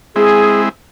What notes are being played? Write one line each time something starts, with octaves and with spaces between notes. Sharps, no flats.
G#3 C4 E4 G#4